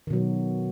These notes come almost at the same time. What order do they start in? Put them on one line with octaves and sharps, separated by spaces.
D#3 B2 F#3